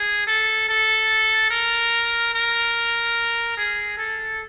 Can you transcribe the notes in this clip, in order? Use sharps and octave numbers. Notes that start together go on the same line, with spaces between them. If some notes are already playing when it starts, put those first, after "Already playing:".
Already playing: G#4
A4
A4
A#4
A#4
G#4
A4